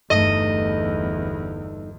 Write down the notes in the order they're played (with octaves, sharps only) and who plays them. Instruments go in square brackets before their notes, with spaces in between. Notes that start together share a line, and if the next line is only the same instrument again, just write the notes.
[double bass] G1 E2 [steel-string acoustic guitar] G2 A3 D#4 [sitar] D#5